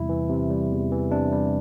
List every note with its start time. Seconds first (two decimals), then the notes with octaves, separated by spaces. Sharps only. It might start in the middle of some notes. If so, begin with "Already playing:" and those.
Already playing: E2 C3 G3 E4
0.09 E3
0.30 C3
0.50 G3
0.71 E2
0.92 E3
1.11 C3 D4
1.32 G3